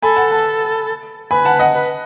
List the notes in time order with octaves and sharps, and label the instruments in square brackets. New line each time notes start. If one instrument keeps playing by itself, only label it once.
[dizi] A4 [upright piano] G#5 B5
[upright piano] F#5 A5
F#5 A5
[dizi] B4 [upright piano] G#5 B5
[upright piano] F#5 A5
D#5 F#5
[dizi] B4